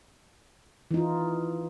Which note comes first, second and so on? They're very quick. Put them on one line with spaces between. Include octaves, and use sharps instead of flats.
E3 D#4 F4